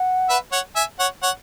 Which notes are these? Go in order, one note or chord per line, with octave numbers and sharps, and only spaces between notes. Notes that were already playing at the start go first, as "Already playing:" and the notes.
Already playing: F#5
B4 E5
C#5 F#5
E5 G#5
C#5 F#5
C#5 F#5